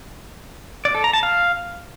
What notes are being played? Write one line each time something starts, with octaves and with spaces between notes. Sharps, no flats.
D5
A4
A#5
A5
F5